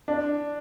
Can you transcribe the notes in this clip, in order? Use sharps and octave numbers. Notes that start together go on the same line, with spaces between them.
D4